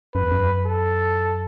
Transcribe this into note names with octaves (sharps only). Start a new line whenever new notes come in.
F#2 B4
E2
F#2
A4